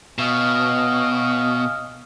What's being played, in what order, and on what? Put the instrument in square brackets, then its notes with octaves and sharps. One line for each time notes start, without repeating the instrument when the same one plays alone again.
[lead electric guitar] B2 [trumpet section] C#4 D#5 F5